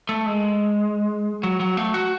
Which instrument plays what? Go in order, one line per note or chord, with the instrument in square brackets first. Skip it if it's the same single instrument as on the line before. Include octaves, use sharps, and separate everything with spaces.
[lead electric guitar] A3
G#3
F#3
F#3
A3
F#4